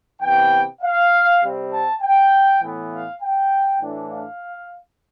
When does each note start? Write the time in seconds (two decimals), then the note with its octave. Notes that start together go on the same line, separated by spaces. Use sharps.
0.21 C3 E3 B3 G5
0.81 F5
1.42 C3 G3 C4
1.72 A5
2.01 G5
2.62 A2 E3 B3
2.92 F5
3.21 G5
3.81 A2 E3 A3 D4
4.11 F5